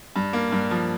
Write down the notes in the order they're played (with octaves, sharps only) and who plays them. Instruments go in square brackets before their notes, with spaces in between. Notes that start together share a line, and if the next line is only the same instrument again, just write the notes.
[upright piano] G2
A#3
G2
F3